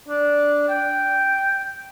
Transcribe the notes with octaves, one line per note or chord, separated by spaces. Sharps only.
D4
G5